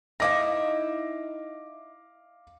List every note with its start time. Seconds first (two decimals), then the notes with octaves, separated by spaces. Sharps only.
0.20 D#4 E4 E5 F5 D6 A#6